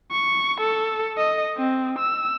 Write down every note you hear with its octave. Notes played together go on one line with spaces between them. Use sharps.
C#6
A4
D#5
C4
E6